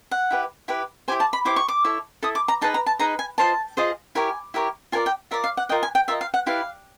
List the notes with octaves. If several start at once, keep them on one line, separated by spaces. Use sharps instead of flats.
F#5
E4 G4 B4
E4 G4 B4
E4 G4 C5 G#5
A5
B5
E4 G4 C5 D6
C#6
D6
E4 A4 C#5
E4 A4 D#6
D6
A#5
D#4 G#4 B4 D#5 A5
A#5
A5
D#4 G#4 B4 D#5 A#5
G#5
F4 G#4 C5 D#5 A5
F4 G#4 C5 D#5
E4 G4 A#4 C#5 G#5
E4 G4 A#4 C#5
F4 A#4 D5 G#5
G5
F4 A#4 D5 E5
F5
F#5
F4 A#4 D#5 G5
G#5
G5
F4 A#4 D#5 E5
F5
F#5
E4 G4 B4 D5 F5